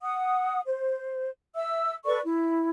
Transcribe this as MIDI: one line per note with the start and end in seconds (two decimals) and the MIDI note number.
0.01 0.61 78
0.01 0.61 87
0.67 1.29 72
1.55 1.95 76
1.55 1.95 88
2.05 2.20 69
2.05 2.20 71
2.05 2.20 74
2.05 2.20 85
2.24 2.70 64